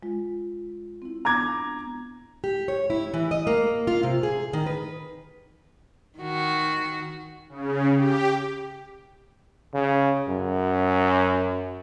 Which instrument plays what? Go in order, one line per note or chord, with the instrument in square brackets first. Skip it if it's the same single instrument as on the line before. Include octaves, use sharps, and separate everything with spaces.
[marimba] G#3 F4
C4 E4
[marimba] B3 D4 [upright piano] A#5 D6 G#6
[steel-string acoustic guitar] G4
C#5
E4
E3
D#5
A#3
F4
C3
G#4
D#3
B4
[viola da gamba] D#3 F#4
[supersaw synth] C#3
G4
[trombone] C#3
F#2